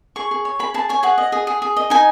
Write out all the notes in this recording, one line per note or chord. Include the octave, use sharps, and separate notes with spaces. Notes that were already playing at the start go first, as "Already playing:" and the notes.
G#4 C#6
G#4
C#5
G#4 B5
G#4 A5
C#5 G#5
G#4 F#5
D#5
G#4
G#4
G#4
D#5
D#4 G#5